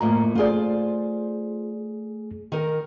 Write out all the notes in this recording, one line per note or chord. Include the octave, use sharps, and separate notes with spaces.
F2 A2 A#3 A#5
A3 F4 G#4 C5 D5
D#3 A#4